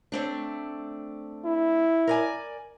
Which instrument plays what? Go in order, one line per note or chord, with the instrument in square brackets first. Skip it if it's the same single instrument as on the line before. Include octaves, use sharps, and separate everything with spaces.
[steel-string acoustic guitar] A3 C4 D4
[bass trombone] E4
[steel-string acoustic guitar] A#4 D5 G#5